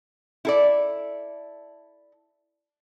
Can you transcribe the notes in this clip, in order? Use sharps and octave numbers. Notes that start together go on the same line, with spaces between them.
E4 A4 D5